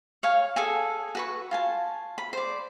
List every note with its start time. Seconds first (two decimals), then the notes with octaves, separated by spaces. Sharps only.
0.23 C#5 F5 G#5
0.56 G#4 A4 G#5
1.15 F#4 B4 C#6
1.51 F4 G#5 A5
2.18 B5
2.33 C5 D5